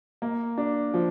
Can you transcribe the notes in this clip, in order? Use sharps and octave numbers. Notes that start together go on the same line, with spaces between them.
A#3
D4
F3